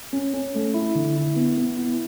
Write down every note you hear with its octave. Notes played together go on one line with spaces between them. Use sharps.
C#4
C#4
A3
E4
D3
E4
B3
B3
E4